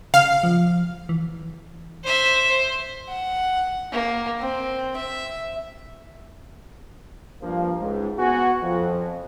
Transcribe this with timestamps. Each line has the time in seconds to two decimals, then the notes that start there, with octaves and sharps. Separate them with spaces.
0.14 C#3 F5
0.43 F3
1.09 E3
2.04 C5 E5
2.49 C5
3.09 F#5
3.92 A#3
4.40 C4
4.96 E5
7.42 G2 F3 A#3
7.80 C#2 G#2
8.19 B3 F#4 G#5
8.61 F2